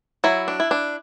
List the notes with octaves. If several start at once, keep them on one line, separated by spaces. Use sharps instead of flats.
F#3 E4
D4
E4
D4